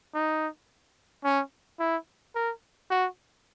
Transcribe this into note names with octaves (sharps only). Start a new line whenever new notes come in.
D#4
C#4
E4
A#4
F#4